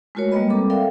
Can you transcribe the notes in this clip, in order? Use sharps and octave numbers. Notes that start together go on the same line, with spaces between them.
G#3 A3 F4 F#4 A#4 C#5
G3 G#3 A#3 B4 D#5 B5
G3 C4 A4 D6
A4 A#4 D5 E5 F5 G5